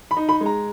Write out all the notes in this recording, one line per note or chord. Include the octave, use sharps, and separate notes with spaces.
B5
D#4
B5
G#3
A#5